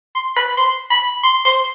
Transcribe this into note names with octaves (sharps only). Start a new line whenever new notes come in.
C6
B5
C6
B5
C6
C6